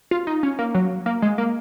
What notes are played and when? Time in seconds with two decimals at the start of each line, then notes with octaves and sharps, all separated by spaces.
0.11 F4
0.27 D#4
0.43 C#4
0.59 A#3
0.74 F#3
1.06 A#3
1.22 G#3
1.38 A#3